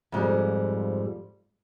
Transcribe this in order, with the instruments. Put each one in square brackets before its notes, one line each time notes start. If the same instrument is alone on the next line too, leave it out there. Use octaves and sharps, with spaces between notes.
[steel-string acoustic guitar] F2 G#2 F3 G3